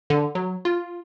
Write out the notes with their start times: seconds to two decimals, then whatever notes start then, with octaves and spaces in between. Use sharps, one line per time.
0.10 D3
0.35 F#3
0.65 F4